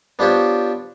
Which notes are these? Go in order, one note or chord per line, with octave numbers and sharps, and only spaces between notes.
B3 D4 F4 G4 C5 C#5